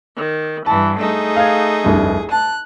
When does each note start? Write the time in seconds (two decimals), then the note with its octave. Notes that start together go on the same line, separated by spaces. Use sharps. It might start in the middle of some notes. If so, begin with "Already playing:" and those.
0.16 D#3
0.66 G2 E3 A5
0.99 A3 D#4 G#4
1.36 F5 G#6
1.84 F1 C2 G2
2.31 A5 F#6